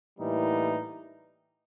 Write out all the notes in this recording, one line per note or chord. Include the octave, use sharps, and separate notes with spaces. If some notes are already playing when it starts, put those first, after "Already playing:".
A2 E3 G3 A#3 D#4